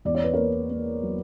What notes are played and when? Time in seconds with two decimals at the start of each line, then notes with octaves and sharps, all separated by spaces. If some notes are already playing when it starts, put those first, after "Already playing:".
0.05 E2 D5
0.15 C#5
0.24 B4
0.34 A#3 A#4 C#5
0.70 A#3
1.03 F#3